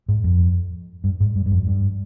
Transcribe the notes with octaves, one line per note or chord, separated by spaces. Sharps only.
G#2
F2
G2
G#2
G2
G2
F2
G2